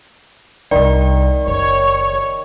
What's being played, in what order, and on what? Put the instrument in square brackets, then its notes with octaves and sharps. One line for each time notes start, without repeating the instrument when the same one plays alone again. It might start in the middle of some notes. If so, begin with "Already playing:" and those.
[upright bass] C2 C3 [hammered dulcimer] D#3 [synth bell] D5
[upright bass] F#1 [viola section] C#5